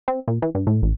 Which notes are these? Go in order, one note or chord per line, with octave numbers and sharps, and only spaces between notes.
C4
A#2
E3
G2
A2
A1